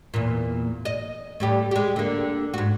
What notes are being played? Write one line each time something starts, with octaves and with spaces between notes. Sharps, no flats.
E2 A#2
D#5
A2 G3 G4
G#3 G4
D3 A#3
G#2 F#4